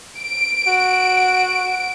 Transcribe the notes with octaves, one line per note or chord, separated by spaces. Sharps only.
D7
F#4